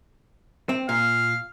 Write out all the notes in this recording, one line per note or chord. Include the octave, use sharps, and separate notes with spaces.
C4
A#2 F5